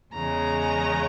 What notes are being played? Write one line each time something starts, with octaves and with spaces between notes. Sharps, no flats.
E2 C#3 G#3 A#5